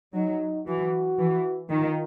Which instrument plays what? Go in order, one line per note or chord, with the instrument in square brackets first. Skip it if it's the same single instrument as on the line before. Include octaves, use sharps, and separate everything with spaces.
[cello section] F#3 [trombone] D#4
[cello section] E3 [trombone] F#4
[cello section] E3
[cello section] D#3 [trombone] F4